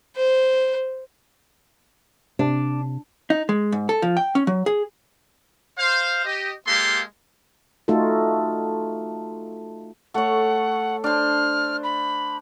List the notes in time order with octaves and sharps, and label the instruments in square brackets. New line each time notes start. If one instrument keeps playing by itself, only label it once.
[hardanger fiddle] C5
[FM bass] C3 [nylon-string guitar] D4
[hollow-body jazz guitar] D#4
G#3
G#2
A4
F3
G5
C#4
F#3
G#4
[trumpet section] C5 F5
G4 D#5
G#3 A#3 G4 A4 F5 C6
[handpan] A3 D#4 F4 F#4 A4
[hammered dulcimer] A3 C#5 [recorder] F#5
[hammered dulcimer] D4 C5 [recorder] F6
[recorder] B5